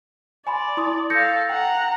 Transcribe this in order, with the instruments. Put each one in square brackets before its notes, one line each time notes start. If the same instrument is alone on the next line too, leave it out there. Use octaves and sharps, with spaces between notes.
[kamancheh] D5 [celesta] G#5 B5 C6
[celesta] E4 C6 D#6
[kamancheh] A4 F5 [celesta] G6 A#6 C#7
[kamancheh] F#5 A#5 [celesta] G5